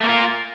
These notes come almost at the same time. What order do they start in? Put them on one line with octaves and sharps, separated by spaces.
A3 A#3 A#4 F4